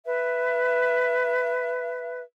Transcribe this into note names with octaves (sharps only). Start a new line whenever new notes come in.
B4 E5